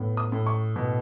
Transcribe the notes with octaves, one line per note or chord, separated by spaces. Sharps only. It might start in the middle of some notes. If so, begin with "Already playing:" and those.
Already playing: A2 B3
D#6
A2
C#6
B2